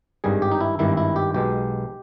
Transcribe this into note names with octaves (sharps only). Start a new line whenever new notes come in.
G#1 G2 D#3 G3 G#4
G4
D#4
E4
G#1 G2 D#3 G3 E4
E4
G4
B1 B2 G#3 G4